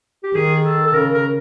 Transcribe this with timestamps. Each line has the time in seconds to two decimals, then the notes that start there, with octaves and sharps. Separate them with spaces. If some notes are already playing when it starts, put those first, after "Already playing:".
0.23 G4
0.35 D#3 G#4
0.64 A4
0.87 A4
0.93 C#3 A#4
1.13 A#4